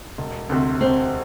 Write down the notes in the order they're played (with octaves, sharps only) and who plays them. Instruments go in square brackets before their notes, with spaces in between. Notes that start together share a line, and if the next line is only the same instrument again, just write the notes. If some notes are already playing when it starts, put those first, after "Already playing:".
[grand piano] E1
D2 C3
[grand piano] E1 [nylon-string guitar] C4